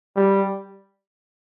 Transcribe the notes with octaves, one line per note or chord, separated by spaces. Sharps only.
G3